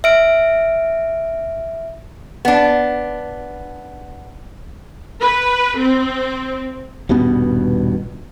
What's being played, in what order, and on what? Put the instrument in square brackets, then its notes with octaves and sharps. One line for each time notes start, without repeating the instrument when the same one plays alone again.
[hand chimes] E5 F6 D7
[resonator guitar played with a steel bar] B3 D4
[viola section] B4
C4
[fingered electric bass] D#1 G2 B2 B3